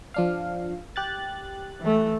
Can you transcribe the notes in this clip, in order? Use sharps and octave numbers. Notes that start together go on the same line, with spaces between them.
F3 D4 F5
G4 F#6 A6
E3 A3